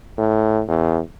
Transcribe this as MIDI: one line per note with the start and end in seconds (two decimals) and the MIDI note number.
0.18 0.61 45
0.68 0.99 40